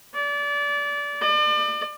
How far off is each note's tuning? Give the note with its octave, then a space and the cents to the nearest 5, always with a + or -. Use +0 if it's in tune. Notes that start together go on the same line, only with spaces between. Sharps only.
D5 -25
D5 +35